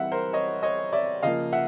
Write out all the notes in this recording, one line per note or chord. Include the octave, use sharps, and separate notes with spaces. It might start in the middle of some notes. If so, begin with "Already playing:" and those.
Already playing: E3 G3 C4 E5 F#5
A#4 C5
C#5 D#5
C#5 D#5
D5 E5
C#3 F3 A#3 D#5 F5
E5 F#5